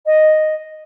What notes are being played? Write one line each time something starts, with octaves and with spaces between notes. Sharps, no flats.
D#5